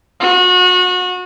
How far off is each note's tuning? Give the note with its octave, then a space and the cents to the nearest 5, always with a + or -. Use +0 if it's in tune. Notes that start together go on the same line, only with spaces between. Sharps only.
F#4 -30